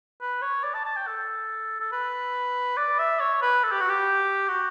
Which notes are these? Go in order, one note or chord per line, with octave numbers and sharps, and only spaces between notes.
B4
C#5
D5
A5
A5
G5
A4
A4
B4
D5
E5
C#5
B4
A4
G4
F#4
G4
F#4